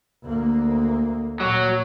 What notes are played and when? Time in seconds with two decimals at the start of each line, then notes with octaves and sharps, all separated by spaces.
0.24 D2 A#3
1.40 A#2 F#3